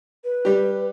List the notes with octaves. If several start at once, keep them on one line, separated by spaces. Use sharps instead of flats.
B4
G3 G4